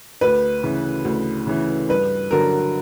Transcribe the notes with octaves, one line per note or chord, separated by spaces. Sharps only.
D2 B4
C#3 E3
D2
C#3 E3
G2 B4
D3 F#3 A#4